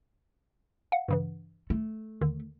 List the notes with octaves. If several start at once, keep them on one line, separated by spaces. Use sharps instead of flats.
F5 F#5
G2 C#3 E3
A3
D#2 D3 D#3